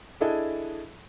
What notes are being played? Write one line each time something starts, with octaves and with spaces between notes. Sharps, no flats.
D4 E4 G#4 A4 D#5